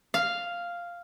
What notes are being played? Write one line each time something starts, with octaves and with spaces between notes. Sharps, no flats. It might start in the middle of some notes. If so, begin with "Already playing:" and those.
F5